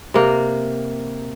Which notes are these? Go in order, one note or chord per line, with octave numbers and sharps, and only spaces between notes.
C3 A#3